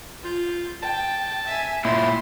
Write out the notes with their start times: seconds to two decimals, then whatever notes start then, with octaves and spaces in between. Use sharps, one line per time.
0.24 F4 G6
0.82 G5 A5
1.46 E5 G#5
1.85 A#2 E4 C6